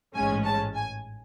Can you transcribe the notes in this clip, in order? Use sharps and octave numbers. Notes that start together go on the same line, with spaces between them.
A1 G#2 G#3 C#4 G#5
A5
G#5